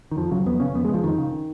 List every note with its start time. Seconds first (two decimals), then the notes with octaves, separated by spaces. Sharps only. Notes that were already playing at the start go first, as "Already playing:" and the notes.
0.11 D#3
0.17 F2 F3
0.31 C#3 F#3
0.46 F2 B3
0.60 C#3 C#4
0.75 F2 B3
0.85 G#3
0.89 C#3
0.94 F3
1.04 F2 D#3
1.18 C#3